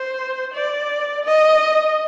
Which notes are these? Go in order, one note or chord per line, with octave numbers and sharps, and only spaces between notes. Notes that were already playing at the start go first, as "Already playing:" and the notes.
Already playing: C5
D5
D#5